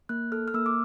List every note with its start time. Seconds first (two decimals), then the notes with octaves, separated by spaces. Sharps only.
0.09 A#3 F#6
0.32 A4 F6
0.48 F6
0.54 A#3 E6
0.66 D6